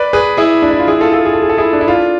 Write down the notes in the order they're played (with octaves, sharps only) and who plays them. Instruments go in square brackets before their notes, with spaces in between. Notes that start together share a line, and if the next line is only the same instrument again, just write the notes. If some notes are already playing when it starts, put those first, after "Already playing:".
Already playing: [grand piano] B4 D5
G#4 B4
E4 G#4
D4
E4
F4
E4 G#4
F4 A4
F4 A4
G#4
A4
G#4
A4
E4 G#4
D4
E4
D4 F4